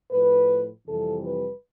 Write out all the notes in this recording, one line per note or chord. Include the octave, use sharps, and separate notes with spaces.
A2 F3 B4
F2 C3 E3 G3 A4
B4